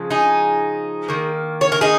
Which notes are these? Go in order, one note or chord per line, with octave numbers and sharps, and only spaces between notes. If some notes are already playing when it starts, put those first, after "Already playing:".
Already playing: C#3 F3 G#3
D#4 G#4
D#3 A#3
C#5
A#4
D#4 G#4